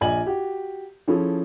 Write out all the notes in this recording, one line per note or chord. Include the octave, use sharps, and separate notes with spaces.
A#1 D5 D#5 G#5 G#6 F#7
F#4 G4
F3 C#4 E4 G#4 A4